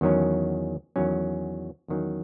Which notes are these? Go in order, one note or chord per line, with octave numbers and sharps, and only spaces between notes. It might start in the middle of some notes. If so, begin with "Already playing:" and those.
E2 D#3 F#3 C#4
E2 D#3 F#3 C#4
E2 D#3 F#3 C#4